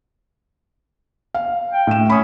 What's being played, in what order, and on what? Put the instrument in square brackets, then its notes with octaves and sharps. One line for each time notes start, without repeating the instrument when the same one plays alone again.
[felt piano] F5
[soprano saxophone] G5
[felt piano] A2 E7
[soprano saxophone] C#4 [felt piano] B5 D#6